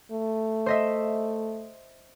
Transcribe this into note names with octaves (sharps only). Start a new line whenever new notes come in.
A3
C5 D#5 E5